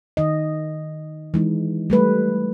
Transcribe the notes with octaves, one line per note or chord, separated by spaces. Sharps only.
D#3 D#5
E3 G#3 D#4
G3 A3 B4